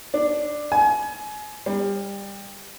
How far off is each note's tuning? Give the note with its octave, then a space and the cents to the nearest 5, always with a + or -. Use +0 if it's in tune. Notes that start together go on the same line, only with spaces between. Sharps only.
D4 +5
G#5 +30
G3 +25